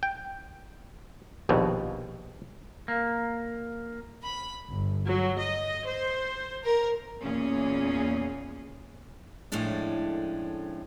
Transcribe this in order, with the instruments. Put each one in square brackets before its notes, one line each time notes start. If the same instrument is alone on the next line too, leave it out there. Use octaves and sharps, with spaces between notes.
[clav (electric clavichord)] G5
A#1 D#2 B2
[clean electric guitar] A#3
[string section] B5
G1
F#3
D#5
C5
A#4
[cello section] E2 A#2 A#3 C#4 G#4
[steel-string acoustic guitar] F2 A2 G#3 C#4 D4